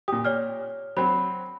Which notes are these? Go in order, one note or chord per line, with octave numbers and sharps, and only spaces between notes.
A#2 G4 D#6
C#5 D5 F6
F#3 C4 B5